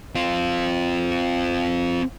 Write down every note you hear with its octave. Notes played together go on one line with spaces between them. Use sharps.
C4 F4